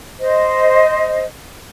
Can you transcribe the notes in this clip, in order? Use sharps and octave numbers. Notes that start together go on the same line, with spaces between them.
C5 D#5